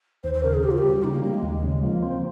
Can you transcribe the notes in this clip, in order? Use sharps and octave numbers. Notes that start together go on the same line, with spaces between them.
D#2 C5
C5
C#3 A#4
G#4
C#3 G4
F4
G4
G3
C#3 D#4
A#3
G3 A#3
G#3
D#2
C#3
F3 A#3
C4